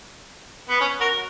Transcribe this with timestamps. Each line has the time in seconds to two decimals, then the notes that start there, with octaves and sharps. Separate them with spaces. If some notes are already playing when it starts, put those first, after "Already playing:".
0.69 B3
0.80 C#4
1.00 F#4 A#4